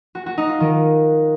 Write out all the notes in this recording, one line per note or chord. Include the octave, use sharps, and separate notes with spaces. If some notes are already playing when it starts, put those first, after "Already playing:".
F#4
F#4
D#4
F4
D#3